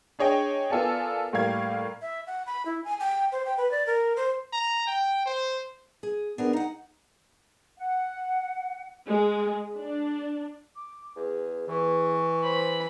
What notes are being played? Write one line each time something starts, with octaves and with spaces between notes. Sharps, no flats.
D4 G#4 C#5 D#5 G5
B3 F4 A4 A#4 D5 G#5
A2 G3 A#3 F5 G#6
E5
F#5
B5
E4
G#5
G5
C5
G5
B4
D5
A#4
C5
A#5
G5
C5
G#4
B3 D4 G#4 A#4
D#4 F5 F#5
F#5
G#3
D4
D6
E2 G#4
E2 E3 C#6
C5 B5